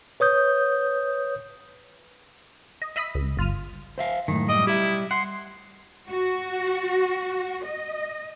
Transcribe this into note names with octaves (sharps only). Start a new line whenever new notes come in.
B4 C#5 D#6 G6
D#5
D#5 E5 B5 D#6 B6
C#2
G1 F4 F6 D#7
C5 E5 F5
F#2 A2 D#3
G3 D#5
E4 G4 E5
F#5 C6
F#4
D#5